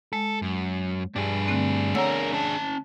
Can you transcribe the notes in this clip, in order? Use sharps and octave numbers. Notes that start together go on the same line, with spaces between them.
G#3 A4
F#2
G2 D4 G#4
D3 A3 C4
A3 A#4 C#5 F#5 E6
C#4 A5